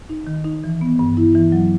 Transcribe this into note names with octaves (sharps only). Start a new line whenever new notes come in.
D#4
D#3
D#4
E3
B3
G2
E4
E3
F#3